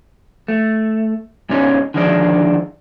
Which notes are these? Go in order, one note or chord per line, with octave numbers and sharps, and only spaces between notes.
A3
G#2 C3 C#4 D#4
D3 D#3 F3 G#3 C4 D4